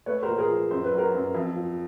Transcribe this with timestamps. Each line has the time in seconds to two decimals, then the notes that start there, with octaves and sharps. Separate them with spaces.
0.06 A3 B4 C#5
0.22 A#4 C5
0.28 A#2
0.38 G#4 A#4
0.49 F3
0.71 F#2 C5
0.84 B4
0.92 F#3
0.98 A#4 C5
1.14 F#2
1.35 F2
1.56 F3